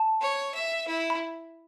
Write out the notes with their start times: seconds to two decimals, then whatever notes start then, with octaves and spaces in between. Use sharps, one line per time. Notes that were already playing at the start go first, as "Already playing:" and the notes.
Already playing: A5
0.21 C#5
0.54 E5
0.87 E4
1.10 B5